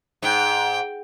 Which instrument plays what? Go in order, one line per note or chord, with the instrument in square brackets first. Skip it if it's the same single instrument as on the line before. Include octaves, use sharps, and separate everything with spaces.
[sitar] G#2 [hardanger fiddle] G5